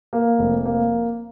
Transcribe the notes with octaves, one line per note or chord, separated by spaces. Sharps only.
A#3
F1
A#3